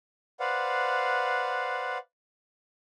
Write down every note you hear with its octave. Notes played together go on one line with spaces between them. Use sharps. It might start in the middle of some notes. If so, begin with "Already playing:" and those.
B4 C5 D5 F5 F#5